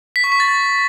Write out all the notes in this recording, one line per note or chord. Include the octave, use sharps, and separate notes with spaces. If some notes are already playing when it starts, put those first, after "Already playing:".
B6
C#6
B6
A6